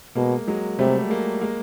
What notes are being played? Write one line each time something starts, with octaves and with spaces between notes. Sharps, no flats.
B2 G#3 A#3
F#3 G#3
C3 G3 A3
G#3 A#3
G#3 A#3